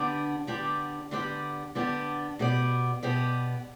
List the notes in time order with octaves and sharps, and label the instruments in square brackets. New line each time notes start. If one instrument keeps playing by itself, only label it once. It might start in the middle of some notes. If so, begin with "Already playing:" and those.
Already playing: [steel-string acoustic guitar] D3 B3 D4 G4 D5
D3 B3 D4 G4 D5
D3 B3 D4 G4 D5
D3 B3 D4 G4 D5
B2 B3 G4 D5
B2 B3 G4 D5